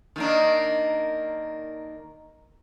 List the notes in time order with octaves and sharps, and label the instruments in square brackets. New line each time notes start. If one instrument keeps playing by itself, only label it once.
[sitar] D#3 A#3 D4